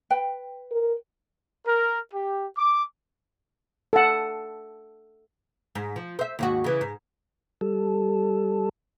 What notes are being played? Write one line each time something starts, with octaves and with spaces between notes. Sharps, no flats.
B4 G5
A#4
A#4
G4
D6
A4 F#5
G#2
F3
C5 E5
D#2 G#2 F#4
C#3 E3
G#2
G3 A4